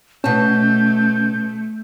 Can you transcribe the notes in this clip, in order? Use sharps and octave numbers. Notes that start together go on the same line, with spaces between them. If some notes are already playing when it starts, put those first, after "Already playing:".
B2 A3 C#4 A5 G6